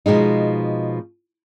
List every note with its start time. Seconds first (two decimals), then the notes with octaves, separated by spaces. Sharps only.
0.06 B2 F3 G#3 D#4